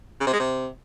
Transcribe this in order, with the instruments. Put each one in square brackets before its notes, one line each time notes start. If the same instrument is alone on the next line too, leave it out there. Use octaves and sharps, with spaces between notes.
[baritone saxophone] C#3
C3
G#3
C3